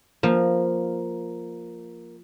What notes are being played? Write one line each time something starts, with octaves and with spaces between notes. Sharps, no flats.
F3 A#3